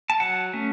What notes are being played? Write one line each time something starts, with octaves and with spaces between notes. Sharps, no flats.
A5
F#3 F#5
A3 C#4